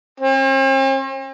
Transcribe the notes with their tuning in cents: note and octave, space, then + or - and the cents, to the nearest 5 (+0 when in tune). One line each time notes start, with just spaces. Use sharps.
C4 +45